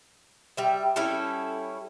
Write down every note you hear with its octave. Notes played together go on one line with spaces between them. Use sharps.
G3 E5
G3 C#4 E4 A4